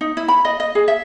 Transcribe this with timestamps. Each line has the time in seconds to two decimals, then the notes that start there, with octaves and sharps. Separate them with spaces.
0.01 D#4
0.17 E4
0.28 B5
0.45 D#5
0.60 D#5
0.75 G#4
0.88 E5